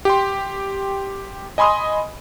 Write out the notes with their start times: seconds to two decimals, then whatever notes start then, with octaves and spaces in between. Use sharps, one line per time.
0.05 G4 G5 C6
1.58 D#5 G#5 B5 C6 D#6